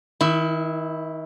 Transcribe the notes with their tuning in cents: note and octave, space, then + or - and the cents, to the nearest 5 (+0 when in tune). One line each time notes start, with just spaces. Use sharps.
D#3 +35 E4 +0